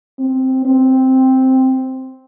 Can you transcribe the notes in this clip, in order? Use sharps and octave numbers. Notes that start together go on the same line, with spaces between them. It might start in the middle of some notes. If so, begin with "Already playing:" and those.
C4
C4